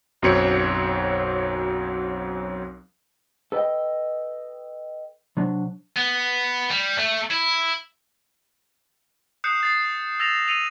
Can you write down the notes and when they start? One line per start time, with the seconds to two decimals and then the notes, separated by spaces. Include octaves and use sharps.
0.22 B1 F#2 F#3 C4 C#5 C#7
3.52 A4 B4 D5 D#5 G5
5.37 C3 F#3 D4
5.97 B3
6.71 G3
6.98 A3
7.31 E4
9.44 D#6 F#6 G6 C7 C#7 E7
9.61 D#6 A6 C7
9.94 A6
10.20 E6 A6 A#6 E7 F7
10.48 E6 C#7 D#7 F7